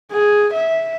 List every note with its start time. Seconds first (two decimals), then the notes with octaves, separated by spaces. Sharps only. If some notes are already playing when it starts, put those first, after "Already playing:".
0.12 G#4
0.53 E5